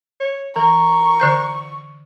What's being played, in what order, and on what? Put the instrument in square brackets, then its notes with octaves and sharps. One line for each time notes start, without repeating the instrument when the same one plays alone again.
[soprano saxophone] C#5
[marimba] E3 [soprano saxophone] A#4 [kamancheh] C#6
[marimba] D3 C5 G6